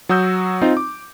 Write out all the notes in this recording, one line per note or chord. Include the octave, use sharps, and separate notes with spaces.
F#3 F#4 D#6 E6 G6
C4 D#4 F4
D6